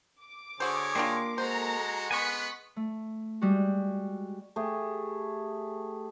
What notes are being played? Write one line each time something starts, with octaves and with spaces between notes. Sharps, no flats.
D6
D3 F#4 G#4 C5 C#5
G3 A#3 D4 F4 C6
G#3 F#4 A4 C5 A#5
G#3 B3 G#5 C#6 F#6 B6
A3
G3 G#3 F#4
A3 G4 G#4